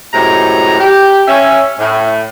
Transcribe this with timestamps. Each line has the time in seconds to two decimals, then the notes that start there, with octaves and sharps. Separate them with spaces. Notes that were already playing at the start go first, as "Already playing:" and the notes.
0.13 F#2 A2 C3 G#3 A#5
0.79 G4
1.28 C#4 E5
1.79 A2